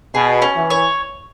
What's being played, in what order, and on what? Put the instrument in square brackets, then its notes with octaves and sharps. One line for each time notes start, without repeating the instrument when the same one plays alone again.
[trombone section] B2 [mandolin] G#4
[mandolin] C#4
[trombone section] E3
[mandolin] C#5